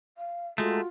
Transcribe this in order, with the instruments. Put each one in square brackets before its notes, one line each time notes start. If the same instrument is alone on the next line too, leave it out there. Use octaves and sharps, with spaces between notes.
[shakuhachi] F5
[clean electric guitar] G#3 A3 [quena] F4 [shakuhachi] F#4 [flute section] A4 A#5